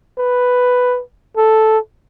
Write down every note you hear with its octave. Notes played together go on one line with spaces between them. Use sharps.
B4
A4